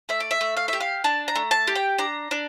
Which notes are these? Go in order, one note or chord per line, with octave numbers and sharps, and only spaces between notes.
A3 E5
D5
E5
A3
F5
G4 E5
F5
D4 A5
A#5
A3
A5
G4
G5
D4 A#5
D4